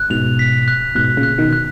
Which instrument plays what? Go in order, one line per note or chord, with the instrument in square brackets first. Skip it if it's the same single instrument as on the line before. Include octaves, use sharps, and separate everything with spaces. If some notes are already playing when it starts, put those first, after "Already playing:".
Already playing: [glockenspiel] F#6
[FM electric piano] G#2 B2 [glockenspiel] F7
[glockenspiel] B6
F#6
[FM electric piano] G#2 B2 [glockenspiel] F#6
[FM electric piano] A#2 C#3
[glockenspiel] F#6
[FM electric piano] B2 D#3
[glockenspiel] F#6